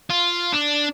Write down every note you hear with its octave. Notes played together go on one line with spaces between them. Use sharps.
F4
D4